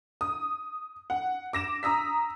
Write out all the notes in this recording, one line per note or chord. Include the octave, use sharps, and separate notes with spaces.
D#6
F#5
D6 A#6 E7
A#5 D#6 E6 B6